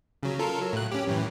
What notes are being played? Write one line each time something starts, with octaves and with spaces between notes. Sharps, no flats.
C#3 F#3
F4 A4 A#4
F#3
A2 F#6
C#4 G4
F#2 A2 E3